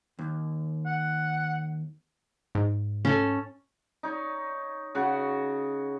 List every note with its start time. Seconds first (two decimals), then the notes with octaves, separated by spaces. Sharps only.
0.19 D#2
0.86 F#5
2.55 G#2
3.05 C#4 A4
4.03 D#4 C#5
4.95 C#3 F#4 F#5